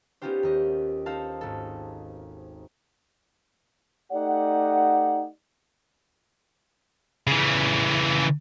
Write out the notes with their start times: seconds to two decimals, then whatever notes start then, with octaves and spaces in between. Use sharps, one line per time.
0.22 B3 C#4 D#4 F4 G4 C5
0.43 D#2 D#5
1.06 D#4 A4 C5 F5 A5
1.41 G#1 A4
4.12 A3 D#4 G4 D5 F#5
7.27 C#3 E3